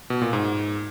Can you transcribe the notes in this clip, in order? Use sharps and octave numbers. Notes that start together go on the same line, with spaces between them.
B2
A#2
G#2